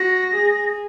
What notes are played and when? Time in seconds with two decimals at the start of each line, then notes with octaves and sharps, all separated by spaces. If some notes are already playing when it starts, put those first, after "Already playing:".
Already playing: F#4 A#6
0.35 G#4